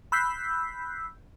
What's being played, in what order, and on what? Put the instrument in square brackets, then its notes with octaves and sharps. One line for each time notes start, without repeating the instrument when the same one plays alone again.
[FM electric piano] B5 E6 F#6 G6 B6 C7